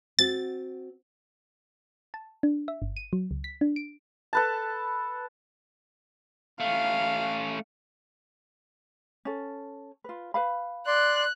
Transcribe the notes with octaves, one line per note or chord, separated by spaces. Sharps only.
C4 F#4 A6
A5
D4
E5
G1
D#7
F#3
C#2
B6
D4
D7
A4 B4 A5
A3 C#4 F5
C#4 A4
F4 B4
B4 F5 B5
D5 C6 F#6